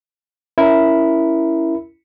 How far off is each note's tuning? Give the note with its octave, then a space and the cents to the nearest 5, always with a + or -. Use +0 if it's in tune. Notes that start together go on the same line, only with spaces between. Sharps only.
C#4 +15 E4 +0 A#4 +0